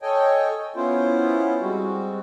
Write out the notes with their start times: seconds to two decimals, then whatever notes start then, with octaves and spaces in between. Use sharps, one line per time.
0.02 A4 C#5 D#5 G5 G#5
0.76 B3 C#4 E4 F4 C5
1.61 G3 G#3 C4 F#4